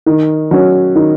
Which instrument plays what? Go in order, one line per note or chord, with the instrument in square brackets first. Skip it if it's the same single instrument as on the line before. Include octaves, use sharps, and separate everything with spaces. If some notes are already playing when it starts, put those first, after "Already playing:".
[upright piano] D#3
F#3 C#4
D#3